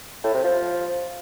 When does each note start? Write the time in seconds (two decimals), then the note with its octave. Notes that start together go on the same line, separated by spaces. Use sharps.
0.24 A2
0.34 C3
0.44 F3